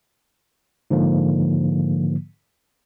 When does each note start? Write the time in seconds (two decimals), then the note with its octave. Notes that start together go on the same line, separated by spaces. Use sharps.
0.90 G#2 D3 F3 A#3